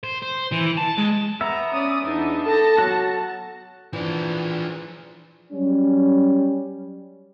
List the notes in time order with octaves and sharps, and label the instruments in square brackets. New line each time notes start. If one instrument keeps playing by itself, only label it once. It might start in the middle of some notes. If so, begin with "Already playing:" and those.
[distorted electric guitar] C5
C5
E3
A5
G#3
[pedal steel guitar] B3 E5 [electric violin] A#5
[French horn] C#4 [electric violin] D5 D#6
[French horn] E2 [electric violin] D4 D#4
[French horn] A4 [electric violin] A5 A#6
[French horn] F#3 [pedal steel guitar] F#4 A4
[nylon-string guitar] E3 [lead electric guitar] F3 D4
[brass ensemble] F#3 G3 C#4